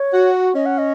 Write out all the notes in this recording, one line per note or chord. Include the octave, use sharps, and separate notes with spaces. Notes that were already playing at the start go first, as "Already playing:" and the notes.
Already playing: C#5
F#4
C#4 D#5
F#5
D#5